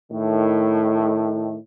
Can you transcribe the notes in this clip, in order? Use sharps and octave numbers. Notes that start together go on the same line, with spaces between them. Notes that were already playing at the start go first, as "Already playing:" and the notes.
A2 D#3